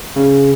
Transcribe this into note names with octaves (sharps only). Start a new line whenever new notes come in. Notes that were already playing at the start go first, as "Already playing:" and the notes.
C#3